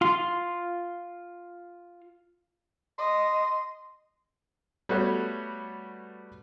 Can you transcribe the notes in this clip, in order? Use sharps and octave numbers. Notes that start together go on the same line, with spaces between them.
F4 C6
D#5 C6
G3 A3 B3 F#4 B4 C#5